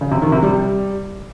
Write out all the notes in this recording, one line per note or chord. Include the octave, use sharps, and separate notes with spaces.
C#3
C3
D#3
C3
G3